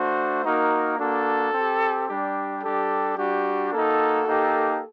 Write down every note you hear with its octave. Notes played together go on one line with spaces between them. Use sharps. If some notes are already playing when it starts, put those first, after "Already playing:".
Already playing: A3 D4 F#4 C5
A#3 D#4 F#4 A#4
A#3 D4 F#4 A4
C4 G4
G3 D4 G4
G3 D4 G4 A4
G3 D4 F#4 G4
A#3 D#4 F#4 A4
A#3 D#4 G4